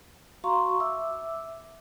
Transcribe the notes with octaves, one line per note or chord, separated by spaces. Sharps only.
F#4 F5 A#5 C6 C#6
E5 D6 E6